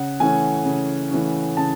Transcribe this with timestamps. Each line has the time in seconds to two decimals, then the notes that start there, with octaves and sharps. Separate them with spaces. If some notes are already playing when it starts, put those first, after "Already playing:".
Already playing: C#3 F#5
0.20 E3 A3 C#4 G#5
0.65 C#3
1.11 E3 A3 C#4
1.57 C#3 A5